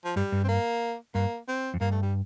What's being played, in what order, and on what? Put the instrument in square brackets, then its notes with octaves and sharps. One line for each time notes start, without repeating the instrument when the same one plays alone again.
[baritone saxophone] F3
[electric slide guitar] G2 [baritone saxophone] G3
[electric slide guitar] G2
[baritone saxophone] C4
A#3
[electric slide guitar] G2 [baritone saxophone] A#3
[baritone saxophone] C4
[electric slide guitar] F2
[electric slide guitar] G2 [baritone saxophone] A#3
[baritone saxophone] A3
G3